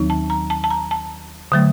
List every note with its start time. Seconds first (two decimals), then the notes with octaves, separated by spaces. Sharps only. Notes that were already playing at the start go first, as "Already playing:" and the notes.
Already playing: D#2 D#3 F#3 C4 D#4
0.10 A5
0.30 A#5
0.50 A5
0.64 A5
0.71 A#5
0.91 A5
1.52 D3 F#3 A3